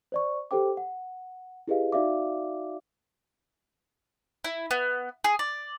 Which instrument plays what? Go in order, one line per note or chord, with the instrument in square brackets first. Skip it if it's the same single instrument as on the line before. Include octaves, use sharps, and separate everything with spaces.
[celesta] C5 D5 C#6
G4 A4 C5 G5 D6
F#5
E4 G4 G#4 B4 D#5 F5
D#4 F#4 D5 E5 F5 D6
[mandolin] E4
B3
G#4
D5